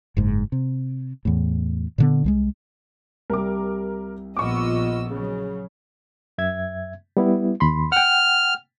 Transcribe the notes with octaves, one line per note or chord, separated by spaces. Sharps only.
F#1 G#2
C3
E2 A2
A#2 D3 B3
C2 F3 G#3
C2 G3 A#4 D6
A#1 B3 F4 D#5 C#6 D6 E6
C#3 F#3
F#2 E5 G#6
G3 B3 E4
D#2 B5 C6
F#5 G5 F6